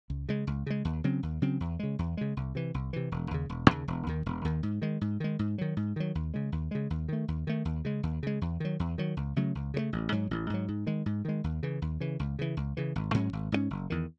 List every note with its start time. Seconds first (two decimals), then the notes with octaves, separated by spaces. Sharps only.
0.10 C#2
0.29 C#3 G#3
0.47 C#2
0.66 C#3 G#3
0.85 D#2
1.04 C#3 F#3 C4
1.23 D#2
1.42 C#3 F#3 C4
1.60 E2
1.79 C#3 G#3
1.99 E2
2.17 C#3 G#3
2.37 C2
2.55 C3 E3
2.74 C2
2.93 C3 E3
3.12 E1
3.31 D#2 C#3
3.49 E1
3.69 D#2 C#3
3.88 E1
4.07 D#2 D#3
4.26 E1
4.45 D#2 D#3
4.63 G#2
4.82 D#3 G#3
5.01 G#2
5.20 D#3 G#3
5.39 G#2
5.58 D#3 F#3
5.77 G#2
5.96 D#3 F#3
6.15 D#2
6.34 C#3 G#3
6.52 D#2
6.71 C#3 G#3
6.90 D#2
7.08 D#3 A3
7.28 D#2
7.47 D#3 A3
7.65 D#2
7.85 C#3 G#3
8.03 D#2
8.23 C#3 G#3
8.41 E2
8.60 D#3 F#3
8.80 E2
8.98 D#3 F#3
9.17 C#2
9.36 C#3 F#3 A3
9.55 C#2
9.74 C#3 F#3 A3
9.93 A1
10.12 G#2 F#3
10.31 A1
10.50 G#2 F#3
10.68 G#2
10.87 D#3 G#3
11.06 G#2
11.25 D#3 G#3
11.44 D#2
11.63 C#3 E3
11.82 D#2
12.00 C#3 E3
12.19 C#2
12.39 C#3 E3
12.57 C#2
12.77 C#3 E3
12.96 G#1
13.14 G#2 F#3 C#4
13.33 G#1
13.52 G#2 F#3 C#4
13.70 F#1
13.90 E2 D#3